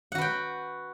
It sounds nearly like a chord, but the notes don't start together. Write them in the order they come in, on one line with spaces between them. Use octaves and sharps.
F#5 F#4 B4 G5